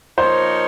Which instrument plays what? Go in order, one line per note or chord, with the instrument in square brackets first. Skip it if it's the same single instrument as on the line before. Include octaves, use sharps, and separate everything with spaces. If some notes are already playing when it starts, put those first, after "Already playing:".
[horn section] F3 A#3 D#4 A#4 C#5 [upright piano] C5